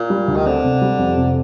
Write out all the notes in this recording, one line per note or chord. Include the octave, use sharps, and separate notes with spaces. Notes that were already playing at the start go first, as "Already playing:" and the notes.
Already playing: A#2
G3
D2
D#3
D3 C4
C3
G3
F2
C3